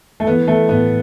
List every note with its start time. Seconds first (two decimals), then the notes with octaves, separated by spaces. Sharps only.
0.20 A3
0.27 E3 B3
0.48 E3 A3
0.69 A2 B3